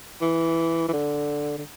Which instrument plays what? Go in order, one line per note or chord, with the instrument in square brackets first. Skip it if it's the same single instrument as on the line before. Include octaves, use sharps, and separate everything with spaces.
[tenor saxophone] E3
E3
D3
D3